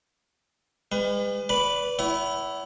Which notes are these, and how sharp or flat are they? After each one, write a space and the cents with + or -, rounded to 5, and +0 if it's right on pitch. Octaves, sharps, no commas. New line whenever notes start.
G#3 -40 B4 +35
B4 +0 D5 -25 B5 +0
E4 +0 C#5 +45 F#5 +40